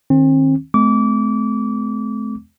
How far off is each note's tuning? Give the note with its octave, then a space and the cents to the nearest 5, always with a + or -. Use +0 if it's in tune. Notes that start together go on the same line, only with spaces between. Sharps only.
D#3 -10 C4 +40
A3 -45 C4 -40 D6 -25